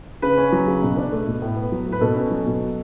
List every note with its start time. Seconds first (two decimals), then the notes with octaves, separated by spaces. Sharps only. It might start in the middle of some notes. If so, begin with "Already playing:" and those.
0.22 C#3 B4
0.37 C#4
0.52 F#3
0.67 C#3
0.82 B2
0.97 D4
1.12 A3
1.27 B2
1.42 A2
1.56 B3
1.72 F#3
1.86 A2
1.92 B4
2.01 B2 A4
2.16 C#4
2.31 F#3
2.47 B2